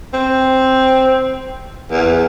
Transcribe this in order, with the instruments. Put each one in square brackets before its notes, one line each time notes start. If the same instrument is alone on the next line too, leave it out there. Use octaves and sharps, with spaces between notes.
[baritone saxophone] C4
E2